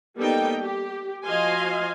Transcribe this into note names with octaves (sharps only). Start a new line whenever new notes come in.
G3 A#3 B3 D#4 A4 G5
G4
F3 F#4 D#5 F5 G#5 C6